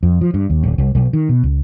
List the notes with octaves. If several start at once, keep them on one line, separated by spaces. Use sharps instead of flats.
F2
F3
G2
D#2
D1
C2
B1
D#3
B2
C#2